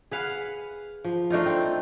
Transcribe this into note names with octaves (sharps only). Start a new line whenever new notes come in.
G#4 B4 F5 F#5
F3
A3 D4 D#4 F4
C4